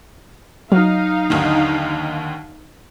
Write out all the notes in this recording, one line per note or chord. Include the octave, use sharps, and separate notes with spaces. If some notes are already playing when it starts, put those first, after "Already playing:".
F#3 D#4 F5 F6
D#2 D3 D#3